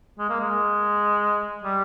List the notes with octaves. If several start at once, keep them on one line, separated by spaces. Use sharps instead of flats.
G#3
A#3
G#3
G3